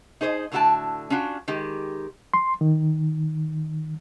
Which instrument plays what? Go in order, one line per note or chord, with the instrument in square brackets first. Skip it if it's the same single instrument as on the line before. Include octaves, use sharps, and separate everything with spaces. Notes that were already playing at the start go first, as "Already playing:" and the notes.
[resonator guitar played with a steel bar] D#4 G#4 C5 C#5 D#5
A2 D3 A3 F#4 G5 A5
C#4 D4 F4 F#4
D#3 G#3 G4
[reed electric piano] C6
D#3